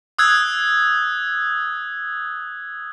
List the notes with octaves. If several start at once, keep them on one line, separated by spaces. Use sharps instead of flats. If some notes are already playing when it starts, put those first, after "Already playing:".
D#6 E6 F#6 G#6